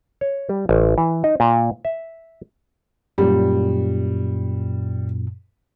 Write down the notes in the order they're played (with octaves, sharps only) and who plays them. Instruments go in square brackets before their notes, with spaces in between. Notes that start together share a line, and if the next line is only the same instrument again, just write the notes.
[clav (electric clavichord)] C#5
G3
A1
E3
D#4
A#2
E5
[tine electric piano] F#2 A#2 [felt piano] G3